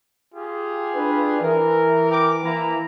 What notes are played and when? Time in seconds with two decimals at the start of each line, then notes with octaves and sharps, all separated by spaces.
0.35 F4 G4 G#4
0.96 D4 B4
1.42 E3 A#4
2.11 A#4 G5 D6
2.44 E3 A#3 E4 A#5